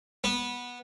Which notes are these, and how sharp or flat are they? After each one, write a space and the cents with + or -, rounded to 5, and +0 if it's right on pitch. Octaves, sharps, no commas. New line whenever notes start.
B3 -15